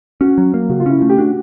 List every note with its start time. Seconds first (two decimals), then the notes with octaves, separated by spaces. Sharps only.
0.21 C#4 F#4
0.38 F#3
0.54 A#3
0.70 C#3 F#4
0.80 F4
0.86 C#4 E4
0.99 A3 F4
1.09 G4
1.18 D4 F#4